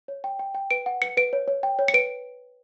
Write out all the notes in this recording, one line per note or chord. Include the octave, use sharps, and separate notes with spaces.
C#5
G5
G5
G5
B4 D7
F#5
B4 C#7
B4 D7
C#5
C#5
G5
C#5
C#7
B4 D7